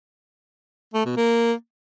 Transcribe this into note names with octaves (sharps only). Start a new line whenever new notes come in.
A3
B2
A#3